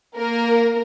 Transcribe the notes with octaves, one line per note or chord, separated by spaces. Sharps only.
A#3 A#4